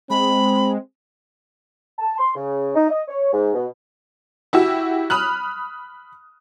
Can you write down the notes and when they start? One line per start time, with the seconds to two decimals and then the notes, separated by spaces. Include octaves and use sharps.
0.10 G#3 C4 B5
1.99 A5
2.18 C6
2.35 C#3
2.74 D#4
2.88 D#5
3.08 C#5
3.32 G#2
3.54 B2
4.53 E4 F#4 G4 E6
5.10 B5 D#6 F6 F#6